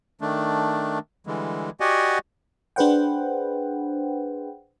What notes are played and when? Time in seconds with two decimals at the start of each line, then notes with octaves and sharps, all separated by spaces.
0.21 D#3 A3 D4
1.27 D3 E3 G3 G#3
1.80 F#4 G4 D5 D#5 F#5 G#5
2.76 D4 G#4 B4 C5 F#5 G5